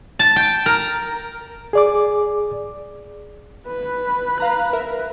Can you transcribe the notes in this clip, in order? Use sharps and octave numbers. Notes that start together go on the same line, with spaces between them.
A5
G5
A#4
G#4 D5 D6
B4
F5 A#5 F#6
A#4 E5